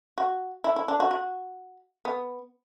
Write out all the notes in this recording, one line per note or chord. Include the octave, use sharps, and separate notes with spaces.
F#4
E4
E4
D4
F#4
F#4
B3